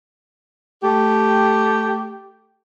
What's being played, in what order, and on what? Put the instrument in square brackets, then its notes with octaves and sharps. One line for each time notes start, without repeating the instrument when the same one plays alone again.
[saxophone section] A3 G4